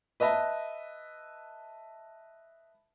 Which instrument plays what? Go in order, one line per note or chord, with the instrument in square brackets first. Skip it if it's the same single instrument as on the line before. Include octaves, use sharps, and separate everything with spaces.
[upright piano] B4 D#5 E5 A5